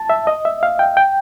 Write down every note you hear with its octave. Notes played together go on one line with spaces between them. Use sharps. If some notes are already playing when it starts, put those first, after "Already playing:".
Already playing: A5
E5
D#5
E5
F5
G5
G5